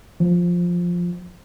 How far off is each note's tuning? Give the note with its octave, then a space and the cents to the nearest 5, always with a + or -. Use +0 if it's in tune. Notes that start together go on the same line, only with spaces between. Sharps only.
F3 +5